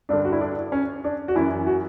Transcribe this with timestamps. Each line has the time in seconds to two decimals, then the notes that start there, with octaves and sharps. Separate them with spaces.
0.09 G2 D3 D4
0.25 F#4
0.32 E4
0.41 D4
0.72 C#4
1.04 D4
1.28 F#4
1.35 F#2 E3 E4
1.67 F#4